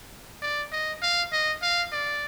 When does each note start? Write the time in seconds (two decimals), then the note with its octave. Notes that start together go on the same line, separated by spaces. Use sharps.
0.42 D5
0.72 D#5
1.02 F5
1.32 D#5
1.62 F5
1.92 D5